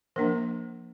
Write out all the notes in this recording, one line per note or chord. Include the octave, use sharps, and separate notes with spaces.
F3 A#3 D4 A#4